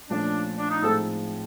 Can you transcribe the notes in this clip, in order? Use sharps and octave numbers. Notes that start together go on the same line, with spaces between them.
A#2 F3 A3 C#4 D4
D4
D#4
A2 F3 G#3 C4 D#4 A4